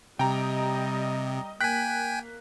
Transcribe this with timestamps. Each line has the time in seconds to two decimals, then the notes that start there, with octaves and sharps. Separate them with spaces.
0.19 C3 G3 D#5 G5 A#5
1.61 A#3 G5 G#5 F#6 B6